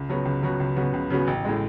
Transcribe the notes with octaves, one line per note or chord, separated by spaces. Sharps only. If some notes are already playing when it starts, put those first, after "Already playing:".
Already playing: C#2
C#3 F#3 B3 F#4
C#2
C#3 F#3 B3 F#4
C#2
C#3 F#3 B3 F#4
C#2
C#3 F#3 B3 F#4
A1
A2 G#3